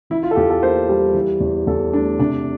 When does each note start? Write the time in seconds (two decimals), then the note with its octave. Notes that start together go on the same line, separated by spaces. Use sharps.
0.10 E3 E4
0.23 F4
0.31 A4
0.36 E2 G4
0.50 A4
0.63 A#3 C5
0.89 G3
1.14 E3
1.40 E2
1.67 E2 A4
1.93 A3 D4
2.19 C3 D4